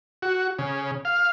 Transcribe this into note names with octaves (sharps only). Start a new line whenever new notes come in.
F#4
C#3
F5